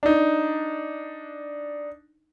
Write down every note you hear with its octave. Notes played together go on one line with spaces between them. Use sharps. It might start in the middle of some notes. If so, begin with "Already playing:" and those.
D4 D#4